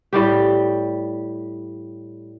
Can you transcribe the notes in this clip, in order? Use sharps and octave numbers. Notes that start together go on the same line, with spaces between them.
A2 G3 G4